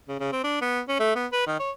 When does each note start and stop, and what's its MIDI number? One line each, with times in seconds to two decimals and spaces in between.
0.08 0.17 49
0.20 0.30 49
0.32 0.42 60
0.44 0.58 62
0.61 0.80 59
0.88 0.99 61
1.00 1.14 57
1.15 1.27 59
1.32 1.47 71
1.47 1.59 51
1.60 1.71 73